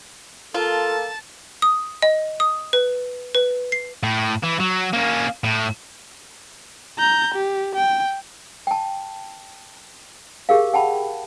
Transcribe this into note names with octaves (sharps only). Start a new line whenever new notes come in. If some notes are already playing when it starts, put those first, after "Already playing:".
A#3 F4 A4 A5
D#6
D#5
D#6
B4
B4
C7
A2
E3
F#3
A#3 C#4
A2
A#5 G6
G4
G5
G5 A5
G4 G#4 A#4 F5
F#5 G5 A5 B5